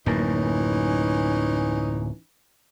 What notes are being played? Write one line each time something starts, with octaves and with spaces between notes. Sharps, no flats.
D1 F#2 E3 A#3 C#4 D#4